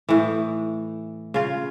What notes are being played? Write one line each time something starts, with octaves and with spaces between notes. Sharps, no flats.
A2 E3
C#3 F4